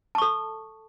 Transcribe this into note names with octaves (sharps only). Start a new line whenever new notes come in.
A4 A5 C#6